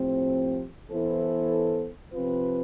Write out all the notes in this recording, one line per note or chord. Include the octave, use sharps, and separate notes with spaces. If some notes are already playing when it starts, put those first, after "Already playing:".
Already playing: A2 F3 C4 G4 C5
E3 B3 E4 A4 C5
C3 F3 C4 F4 B4